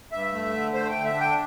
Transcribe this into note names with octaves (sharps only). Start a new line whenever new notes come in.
G2 E5
A3
D3
A3 C5
G5
D3
E5
D4
G5